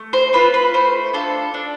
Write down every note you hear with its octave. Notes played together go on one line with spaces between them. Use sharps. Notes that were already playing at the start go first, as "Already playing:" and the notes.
Already playing: A3
C5
C4 F4 B4
B4
A3 C5
D4 F4 A4
D4